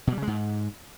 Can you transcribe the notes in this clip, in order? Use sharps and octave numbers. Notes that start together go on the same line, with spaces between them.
B2
G3
C#3
G#3
G#2